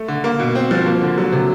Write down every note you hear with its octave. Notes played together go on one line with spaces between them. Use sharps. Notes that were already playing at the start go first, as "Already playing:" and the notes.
Already playing: A3
D3
A#3
B2
C4
F3
A#3
D3
F#3
C3